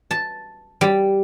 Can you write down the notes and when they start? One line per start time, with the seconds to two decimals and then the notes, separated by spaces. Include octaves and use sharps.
0.11 A5
0.81 G3